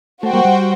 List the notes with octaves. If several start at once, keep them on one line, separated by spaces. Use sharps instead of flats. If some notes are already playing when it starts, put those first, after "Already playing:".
A3 F#4 C5 G5
G3 A#3
G3